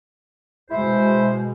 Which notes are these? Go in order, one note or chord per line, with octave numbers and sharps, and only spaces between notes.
B2 G#3 E4 C5